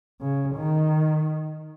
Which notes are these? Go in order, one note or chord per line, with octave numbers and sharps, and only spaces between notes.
C#3
D#3